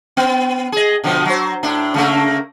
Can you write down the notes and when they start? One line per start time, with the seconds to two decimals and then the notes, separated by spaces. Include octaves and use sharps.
0.17 B3
0.72 G#4 D#5
1.04 B2 D3 F3
1.25 F#3 C5
1.63 A2 D4
1.94 C#3 A3 A#3